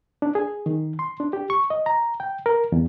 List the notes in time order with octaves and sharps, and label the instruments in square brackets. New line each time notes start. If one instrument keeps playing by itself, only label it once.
[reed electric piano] D4
G#4
D#3
C6
D4
G4
C#6
D#5
A#5
G5
A#4
E2